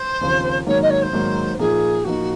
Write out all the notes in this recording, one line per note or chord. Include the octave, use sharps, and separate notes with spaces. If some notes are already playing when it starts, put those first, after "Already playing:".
Already playing: C5
D#2 C#3 F3 C4
G#2 D#3 F#3 A#3 C#5
D#5
C#5
C5
G#2 D#3 F#3 A#3
A#2 F3 A#3 D#4 G#4
A#2 F3 A#3 D#4 F#4